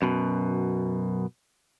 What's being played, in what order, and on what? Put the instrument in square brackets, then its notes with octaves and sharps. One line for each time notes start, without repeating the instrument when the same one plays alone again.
[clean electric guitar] F#2 B2